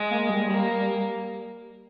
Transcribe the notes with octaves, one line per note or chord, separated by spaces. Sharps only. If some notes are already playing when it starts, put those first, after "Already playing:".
Already playing: G#3
A#3
G3
G3 A#3